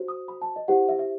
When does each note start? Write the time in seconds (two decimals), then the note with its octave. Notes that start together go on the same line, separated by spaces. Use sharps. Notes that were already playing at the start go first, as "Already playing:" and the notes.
Already playing: F#4 C5
0.08 D#6
0.28 B5
0.42 A5
0.56 D#5
0.68 E4 G4 C5 F#5
0.89 E5
0.99 E5